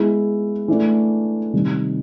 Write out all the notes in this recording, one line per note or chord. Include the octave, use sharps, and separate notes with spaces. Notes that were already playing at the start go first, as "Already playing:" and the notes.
Already playing: G#3 B3 E4 G#4
E3 A3 D4
C3 D#3 G3